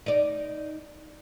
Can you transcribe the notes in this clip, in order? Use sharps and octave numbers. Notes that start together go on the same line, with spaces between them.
D#4 D5